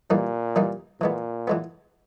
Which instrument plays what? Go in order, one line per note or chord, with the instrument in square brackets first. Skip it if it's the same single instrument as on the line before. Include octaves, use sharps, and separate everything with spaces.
[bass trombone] A#2 [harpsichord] E3 G3 A#3 D#4
[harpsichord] E3 G3 A#3 D#4
[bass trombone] A#2 [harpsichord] E3 G#3 B3
[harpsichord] E3 G#3 B3